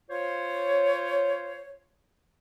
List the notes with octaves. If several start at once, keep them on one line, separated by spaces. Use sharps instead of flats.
F4 C5 C#5